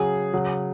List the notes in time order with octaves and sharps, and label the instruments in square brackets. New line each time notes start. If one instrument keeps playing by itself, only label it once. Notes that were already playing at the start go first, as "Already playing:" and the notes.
Already playing: [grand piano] C#3 F#3 G#4
C#3 F#3